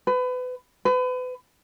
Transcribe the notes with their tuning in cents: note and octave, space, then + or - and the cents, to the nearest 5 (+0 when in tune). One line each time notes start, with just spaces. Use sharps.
B4 +30
B4 +35